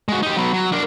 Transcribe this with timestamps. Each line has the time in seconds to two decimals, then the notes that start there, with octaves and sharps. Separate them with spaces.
0.09 G#3 F#4
0.23 D#4 G4
0.37 F#3 B3
0.53 F#3
0.72 D4 A#4